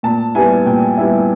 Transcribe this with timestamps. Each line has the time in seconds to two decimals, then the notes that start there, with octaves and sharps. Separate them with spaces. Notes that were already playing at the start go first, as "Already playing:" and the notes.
0.03 A#2 A5
0.35 G3 B3 E4 G#5
0.65 A#2 G5
0.98 G3 B3 E4